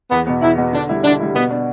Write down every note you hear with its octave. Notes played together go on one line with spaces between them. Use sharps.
E2 B3
B2 B3
E2 E4
B2 B3
D3 D4
G3 E4
D3 D4
G3 E4
B2 B3
B3 D4